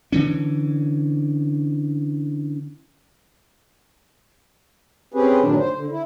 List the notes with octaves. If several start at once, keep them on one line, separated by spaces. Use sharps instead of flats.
D3 E3 C#4
C4 C#4 G4 G#4 B4
D2 G2 A#2 D#3 F#3 D4
C5
D3
E4